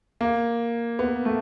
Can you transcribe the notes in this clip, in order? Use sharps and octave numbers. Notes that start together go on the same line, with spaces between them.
A#3
B3
A3